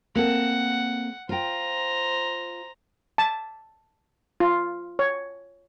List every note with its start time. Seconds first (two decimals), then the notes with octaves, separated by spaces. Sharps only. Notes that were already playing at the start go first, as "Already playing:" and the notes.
0.15 A#3 C4 A4 F#5
1.29 F4 C5 G5 A#5
3.18 A5
4.40 F4
4.99 C#5